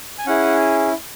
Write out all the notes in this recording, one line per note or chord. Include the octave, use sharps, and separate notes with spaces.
G#5
C#4 E4 G#4 F#5